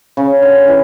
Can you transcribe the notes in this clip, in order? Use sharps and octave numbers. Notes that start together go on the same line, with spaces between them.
C#3
D3
E3